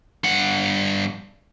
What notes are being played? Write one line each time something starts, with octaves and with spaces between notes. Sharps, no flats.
G2 F#5